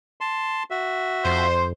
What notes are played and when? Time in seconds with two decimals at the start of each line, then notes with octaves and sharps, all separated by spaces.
0.21 A5 C6
0.71 F#4 E5
1.25 F2 C5